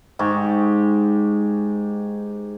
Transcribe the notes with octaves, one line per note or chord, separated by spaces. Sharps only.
G#2 G4 C#6